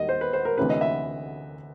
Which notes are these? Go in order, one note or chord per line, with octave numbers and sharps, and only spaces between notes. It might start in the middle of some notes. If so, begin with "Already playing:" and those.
Already playing: D#2 G3 D#5
C5
B4
C5
A#4
D2 C3 E3 A3 C#4 B4
D#5
E5